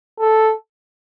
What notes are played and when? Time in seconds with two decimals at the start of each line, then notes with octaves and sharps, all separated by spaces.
0.20 A4